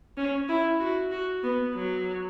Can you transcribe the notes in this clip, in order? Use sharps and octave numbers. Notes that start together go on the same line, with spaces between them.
C#4
E4
F#4
F#4
B3
F#3